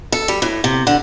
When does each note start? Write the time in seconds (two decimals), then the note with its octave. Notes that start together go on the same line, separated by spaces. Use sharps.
0.12 A4
0.28 G3
0.42 A2
0.64 C3
0.87 D3